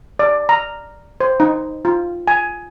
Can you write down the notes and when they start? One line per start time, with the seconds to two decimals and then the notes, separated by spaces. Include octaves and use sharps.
0.19 D5
0.49 A#5
1.20 C5
1.40 D#4
1.85 F4
2.27 G#5